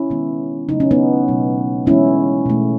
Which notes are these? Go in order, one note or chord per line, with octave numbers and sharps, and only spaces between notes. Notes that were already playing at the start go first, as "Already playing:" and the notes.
Already playing: C#4 E4
D#3 G#3 B3
C#3 F#3 A3 D#4
C#4
B3 D#4
B2 F#3 A3
E3 G#3 B3 C#4 E4
B2 A3